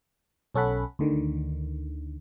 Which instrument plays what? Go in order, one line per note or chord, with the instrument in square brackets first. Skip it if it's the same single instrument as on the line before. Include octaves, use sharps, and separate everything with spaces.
[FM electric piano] B1 C#4 A4 F#5 B5
D2 D3 D#3